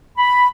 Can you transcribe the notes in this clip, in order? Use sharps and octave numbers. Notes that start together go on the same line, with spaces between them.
B5